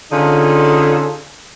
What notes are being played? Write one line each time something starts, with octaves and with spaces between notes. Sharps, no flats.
D3 C#4 D#4 F4 G#4 A4